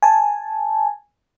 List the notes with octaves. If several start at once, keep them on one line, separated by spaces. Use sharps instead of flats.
G#5 A5